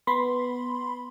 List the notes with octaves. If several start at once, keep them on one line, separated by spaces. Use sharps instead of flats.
B3 B5 C6